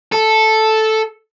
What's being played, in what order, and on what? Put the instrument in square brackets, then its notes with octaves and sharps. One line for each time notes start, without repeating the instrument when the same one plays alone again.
[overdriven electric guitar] A4